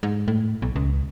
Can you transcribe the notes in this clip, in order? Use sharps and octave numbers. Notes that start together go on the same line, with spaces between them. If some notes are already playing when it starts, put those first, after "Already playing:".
G#2
A2
B1
C#2